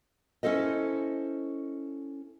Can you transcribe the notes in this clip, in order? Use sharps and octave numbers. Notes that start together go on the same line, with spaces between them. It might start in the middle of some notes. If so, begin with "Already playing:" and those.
C#4 E4 A4 C5 D#5